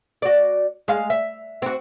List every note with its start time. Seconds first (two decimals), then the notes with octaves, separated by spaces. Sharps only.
0.22 F#4 D5
0.88 G#3 F5
1.10 E5
1.62 C4 F#4